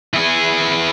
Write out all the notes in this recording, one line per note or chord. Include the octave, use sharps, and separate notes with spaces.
E3 G#4